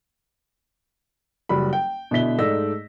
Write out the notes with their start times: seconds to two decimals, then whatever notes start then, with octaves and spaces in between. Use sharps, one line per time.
1.49 F#1 G3 F#4 B5
1.73 G5
2.11 B2 D3 E4 B6 G7
2.39 G#2 A3 D#4 D5 E6 A#6